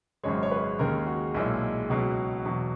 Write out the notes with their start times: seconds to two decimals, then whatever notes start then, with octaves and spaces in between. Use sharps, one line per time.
0.23 G#1 F#2 C#3 G#3 C#5
0.43 C#5
0.51 B4
0.79 D#2 C#3 G#3 A#4
1.07 F#4
1.34 B1 A#2 G#3 E4
1.90 C#2 B2 F#3
2.45 E2 B2 F#3